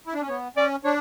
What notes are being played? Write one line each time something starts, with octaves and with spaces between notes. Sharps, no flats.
E4
D4
C#4
B3 C#5
C#4 D5
D4 C#5